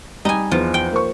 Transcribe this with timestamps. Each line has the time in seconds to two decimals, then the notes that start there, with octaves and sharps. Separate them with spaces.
0.25 G3 D#4 G#5
0.51 E2 F3
0.74 G5
0.92 A#3 C5 C#6